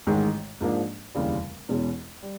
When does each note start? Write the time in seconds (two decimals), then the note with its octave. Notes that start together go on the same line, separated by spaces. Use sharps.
0.07 A1 G#2 D#3 G#3
0.61 G#2 F3 A#3 D4
1.15 F1 D#2 C#3 E3 G3
1.69 E2 B2 G#3 C#4 E4
2.23 G3